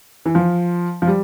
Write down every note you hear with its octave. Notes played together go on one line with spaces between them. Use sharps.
E3
F3
F3
G3